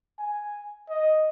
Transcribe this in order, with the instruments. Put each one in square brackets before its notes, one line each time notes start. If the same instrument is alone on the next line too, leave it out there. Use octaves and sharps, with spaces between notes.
[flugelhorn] G#5
D#5